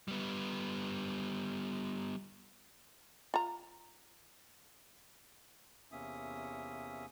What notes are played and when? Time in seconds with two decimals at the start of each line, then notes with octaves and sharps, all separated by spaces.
0.08 G3 B3
3.34 F4 A#5
5.92 E2 C3 A#3 C#4 E5 D#6